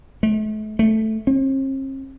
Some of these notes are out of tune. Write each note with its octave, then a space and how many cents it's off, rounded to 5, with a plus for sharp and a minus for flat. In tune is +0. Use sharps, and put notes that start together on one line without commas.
A3 -40
A3 +0
C4 +45